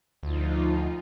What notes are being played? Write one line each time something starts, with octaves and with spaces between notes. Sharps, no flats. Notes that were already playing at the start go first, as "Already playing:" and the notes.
D2 F3 D#4 F4